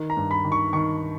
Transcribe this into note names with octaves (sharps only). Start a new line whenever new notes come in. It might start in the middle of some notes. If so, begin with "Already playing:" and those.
Already playing: D#3
A#5
G2
B5
D#3
C#6
D#3 C#6